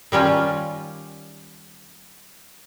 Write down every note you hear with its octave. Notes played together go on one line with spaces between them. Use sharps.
D#3 G3 C#4 F4